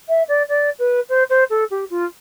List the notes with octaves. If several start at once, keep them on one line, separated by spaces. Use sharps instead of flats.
E5
D5
D5
B4
C5
C5
A4
G4
F4